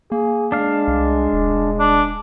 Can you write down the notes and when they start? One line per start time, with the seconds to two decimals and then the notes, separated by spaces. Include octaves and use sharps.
0.12 A#3 G#4
0.52 G#3 D4 F5
0.88 C2
1.33 D#1
1.79 D4